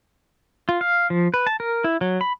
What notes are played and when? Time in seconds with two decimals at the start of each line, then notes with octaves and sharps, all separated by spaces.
0.69 F4
0.81 F5
1.10 F3
1.34 B4
1.47 A5
1.60 A#4
1.84 E4
2.01 F#3
2.21 B5